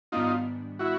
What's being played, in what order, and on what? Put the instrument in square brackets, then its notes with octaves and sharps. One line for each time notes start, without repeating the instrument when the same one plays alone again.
[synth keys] G#2 D#3 G3 B3 D4 [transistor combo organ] D#4 F4
[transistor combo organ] E4 F#4